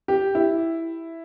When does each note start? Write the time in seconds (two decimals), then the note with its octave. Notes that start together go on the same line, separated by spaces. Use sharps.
0.08 G4
0.35 E4